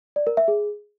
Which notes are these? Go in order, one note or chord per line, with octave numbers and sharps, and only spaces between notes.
D5
A#4
E5
G#4